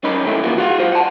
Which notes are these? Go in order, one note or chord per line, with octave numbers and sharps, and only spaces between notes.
F#2 C#4 D#4 A#4 B5
D#3 A3 E4
E2 G2 D#3 A#3 F4 F#4
F#4 F5 F#5
B1 F4 C5
F#5 A5